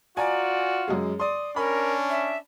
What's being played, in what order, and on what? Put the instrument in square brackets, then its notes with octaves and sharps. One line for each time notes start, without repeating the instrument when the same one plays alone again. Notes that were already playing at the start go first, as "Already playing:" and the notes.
[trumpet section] F4 F#4 [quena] D5 [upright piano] G#5 A#5
[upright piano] F#2 G#3 G#4
[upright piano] D5 C6 [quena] D#6
[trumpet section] C#4 D4 [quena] A#4 [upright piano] B5
[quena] E5